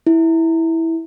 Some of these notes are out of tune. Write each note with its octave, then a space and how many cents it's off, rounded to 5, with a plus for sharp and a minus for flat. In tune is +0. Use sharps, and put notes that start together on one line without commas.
E4 -10